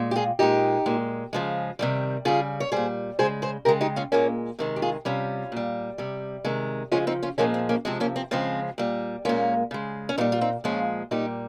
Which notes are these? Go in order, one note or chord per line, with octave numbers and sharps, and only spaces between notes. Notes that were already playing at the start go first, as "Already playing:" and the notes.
Already playing: A#2 G#3
G4
F4 G#4
A#2 G#3 D#4 G4
A#2 G#3
C#3 F3 G#3
C3 D#3 G3
C#3 G3 F4 G#4
C#5
A#2 G3 G#4 C5
C#3 G#3 G#4 C5
G#4 C5
C#3 G#3 G4 A#4
D#4 G4
C#4 F4
A#2 G#3 A#3 C#4
C3 D#3 G#3 C4
G4
F4 G#4
C3 G3 C#4 F4
A#2 G3
C3 G3
C3 D#3 G#3
C#3 F3 G#3 C#4 F4
C4 D#4
C#4 F4
A#2 F3 G#3 A#3 C#4
C4
A#3 C#4
C3 F3 G#3 C4
A#3 C#4
C4
C#3 F3 G#3 C4
A#2 G3
A#2 G#3 A#3 C#4
C#3 G#3
C#4
A#2 G3 C4 D#4
F4
C4 D#4
A#2 F3 G#3 C#4 F4
A#2 G3 D#4 G4